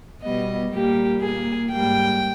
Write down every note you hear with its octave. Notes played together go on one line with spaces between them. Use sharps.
B2 G3 B3 D#5
A#2 G3 A#3 G4
A#2 A#3 G#4
G#2 G3 A#3 G5